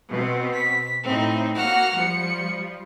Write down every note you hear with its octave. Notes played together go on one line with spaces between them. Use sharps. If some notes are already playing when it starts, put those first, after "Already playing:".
B2 C4
B6
A2 C4 D#4
A#3 F#4 F#5 F6
F3 G3 C#7